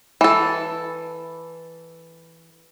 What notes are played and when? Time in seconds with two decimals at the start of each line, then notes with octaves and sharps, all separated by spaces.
0.21 E3 A4